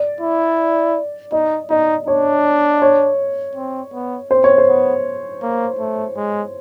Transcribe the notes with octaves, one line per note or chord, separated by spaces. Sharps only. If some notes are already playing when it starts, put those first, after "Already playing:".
Already playing: D5
E4
D#4 D#5
D#4 D#5
D4 C#5
C#5
C4
B3
C4 C5
C#5
C5
B3
A#3
A3
G#3